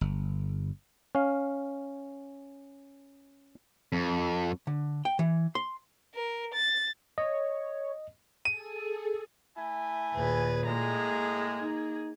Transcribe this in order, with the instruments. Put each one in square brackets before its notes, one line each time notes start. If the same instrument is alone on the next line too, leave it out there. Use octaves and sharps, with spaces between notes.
[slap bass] G1
[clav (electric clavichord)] C#4 F5
[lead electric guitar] F2
[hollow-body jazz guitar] D3
G5
E3
C6
[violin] A#4
A6
[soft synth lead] C#5 [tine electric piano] D#5
[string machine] G#4 A4 [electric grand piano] D#7
[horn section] A3 E4 G#5
[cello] D#2 G#4 [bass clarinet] A#2 [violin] B4
[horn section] A2 G#3 [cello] A#3 G#4 [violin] A#5
[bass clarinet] D#4